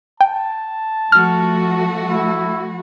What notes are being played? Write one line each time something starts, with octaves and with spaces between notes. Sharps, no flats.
G5 A5
F3 A3 F#4 F6
E4